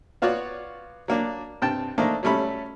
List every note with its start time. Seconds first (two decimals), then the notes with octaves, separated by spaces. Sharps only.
0.22 B3 F4 F#4 C#5 D5
1.08 F#3 A#3 D4
1.62 G2 C3 G5 A5
1.98 F3 A3 A#3 D4 D#4
2.23 F#3 G3 A3 C#4 B5